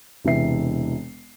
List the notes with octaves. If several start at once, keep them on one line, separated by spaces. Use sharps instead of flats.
E1 C3 E3 E5 C7